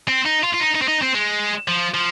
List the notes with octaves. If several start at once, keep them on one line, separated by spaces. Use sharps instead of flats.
C4
D#4
F4
F4
D#4
D#4
C4
D#4
C4
G#3
F3
F3